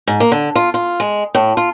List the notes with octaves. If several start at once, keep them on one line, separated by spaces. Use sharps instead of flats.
G#2
A#3
D3
F4
F4
G#3
A2
F4